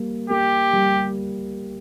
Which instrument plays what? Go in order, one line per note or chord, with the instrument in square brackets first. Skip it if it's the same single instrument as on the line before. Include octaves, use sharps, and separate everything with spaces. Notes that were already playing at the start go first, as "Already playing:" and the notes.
Already playing: [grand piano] G3 A#3
[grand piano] A#3 [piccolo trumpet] G4
[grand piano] G3